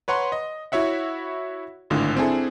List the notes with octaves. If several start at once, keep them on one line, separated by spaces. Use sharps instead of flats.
B4 C#5 F#5 A#5 C6
D#5
E4 F#4 C#5 E5 F#5
G#1 A2 D3 D#3 F4
C4 D4 E4 G#4 A4